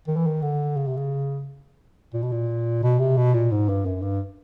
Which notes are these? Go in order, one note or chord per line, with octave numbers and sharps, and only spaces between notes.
D#3
E3
D#3
D3
C#3
C3
C#3
A#2
B2
A#2
B2
C3
B2
A#2
G#2
G2
F#2
G2